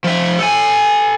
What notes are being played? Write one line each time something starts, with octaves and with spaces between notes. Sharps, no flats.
F3 E5
A4 G#5